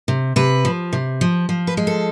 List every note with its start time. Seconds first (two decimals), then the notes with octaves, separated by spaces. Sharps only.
0.08 C3
0.36 C3 B4
0.65 F3
0.93 C3
1.21 F3
1.49 F3
1.67 B4
1.77 G#3
1.87 A4